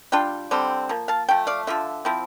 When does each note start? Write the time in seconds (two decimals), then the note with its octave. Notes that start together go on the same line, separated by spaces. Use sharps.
0.12 G3 D4 F4 G5
0.51 D3 G3 C4
0.89 F3 A#3
1.08 F5 A5
1.29 F3 A3 G5
1.47 D5 F5
1.67 D3 F3 F4 E5
2.05 F3 C4 E4